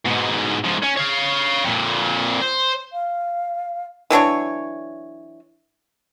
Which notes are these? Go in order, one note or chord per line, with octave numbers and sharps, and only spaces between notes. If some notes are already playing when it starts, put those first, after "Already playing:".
G#2 B2
G#2 F3
C#4
C#5 F5
F2 A#2
C5
F5
E3 F#3 D4 C#5